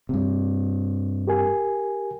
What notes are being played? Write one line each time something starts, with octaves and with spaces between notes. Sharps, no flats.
G2 C3
G4 A#4 G#5